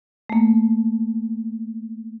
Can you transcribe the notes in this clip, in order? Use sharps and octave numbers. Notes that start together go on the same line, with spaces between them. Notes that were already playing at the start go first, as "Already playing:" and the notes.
A3 A#3